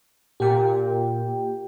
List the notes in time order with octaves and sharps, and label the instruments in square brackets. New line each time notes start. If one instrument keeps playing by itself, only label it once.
[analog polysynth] A#2 [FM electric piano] G4 G5